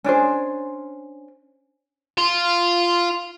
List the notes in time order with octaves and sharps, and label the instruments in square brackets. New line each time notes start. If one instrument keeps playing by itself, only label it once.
[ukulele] C#4 D4 G#4 C5
[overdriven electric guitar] F4